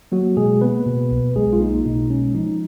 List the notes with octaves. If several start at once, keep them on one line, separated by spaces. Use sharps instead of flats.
F#3 A#3 F#4
B2 G#3 G#4
A#3 B3 B4
B2
B1
B1 G#3 G#4
F4
A#3 D#4
B2 D#4
G#3 C#4
F3 D#4